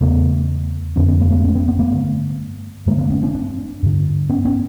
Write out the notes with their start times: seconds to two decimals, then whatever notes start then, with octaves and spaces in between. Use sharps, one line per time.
0.01 E2 C#3 A3 B3
0.96 F2 D3 B3 C#4
1.08 B3 C#4
1.20 A3 B3
1.32 A3 B3
1.44 B3 C#4
1.55 B3 C#4
1.68 A#3 C4
1.79 A3 B3
1.91 G2 D3
2.86 G2 D3 G#3 A#3
2.98 A3 B3
3.10 B3 C#4
3.23 C4 D4
3.34 C4 D4
3.83 G2 D3
4.29 B3 C#4
4.45 B3 C#4